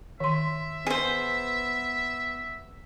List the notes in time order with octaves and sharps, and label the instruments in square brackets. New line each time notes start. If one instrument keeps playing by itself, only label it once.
[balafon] D#3 C6 [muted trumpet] E5
[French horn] B3 [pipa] G#4 C5